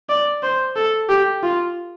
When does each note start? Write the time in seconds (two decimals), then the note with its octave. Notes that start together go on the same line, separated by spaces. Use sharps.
0.09 D5
0.43 C5
0.76 A4
1.09 G4
1.43 F4